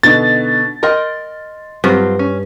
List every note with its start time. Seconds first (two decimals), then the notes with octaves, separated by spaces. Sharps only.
0.03 B2 D3 D#4 A6
0.83 A#4 D#5 G5 C6
1.84 G2 F#3 C4 F4
2.19 C#4